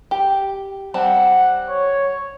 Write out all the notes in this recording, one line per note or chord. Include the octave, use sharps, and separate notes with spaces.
G4
G3 C4 F#5 A5
C#5